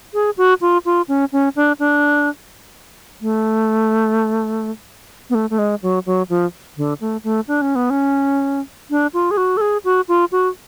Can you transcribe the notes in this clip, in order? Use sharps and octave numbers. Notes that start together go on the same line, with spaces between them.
G#4
F#4
F4
F4
C#4
C#4
D4
D4
A3
B3
A3
A3
G#3
F#3
F#3
F3
D3
A3
A3
D4
C#4
B3
C#4
D4
F4
G#4
F#4
A4
G#4
F#4
F4
F#4